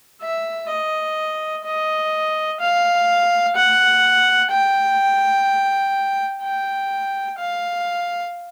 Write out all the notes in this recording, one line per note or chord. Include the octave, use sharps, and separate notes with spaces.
E5
D#5
D#5
F5
F#5
G5
G5
F5